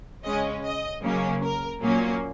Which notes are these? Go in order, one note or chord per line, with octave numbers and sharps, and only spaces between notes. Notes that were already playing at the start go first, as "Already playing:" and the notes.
C#3 G#3 C#4 D#5
D#5
C#3 F#3 A#3 C#4
A#4
A#2 F#3 A#3 C#4